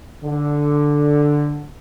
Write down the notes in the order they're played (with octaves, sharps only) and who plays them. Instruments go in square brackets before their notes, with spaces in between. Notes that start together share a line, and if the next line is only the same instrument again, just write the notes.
[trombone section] D3